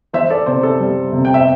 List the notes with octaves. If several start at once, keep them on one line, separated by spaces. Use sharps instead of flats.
E3 C5 E5
A4 D5
C3 C5
A4
G3
C3
G5
E5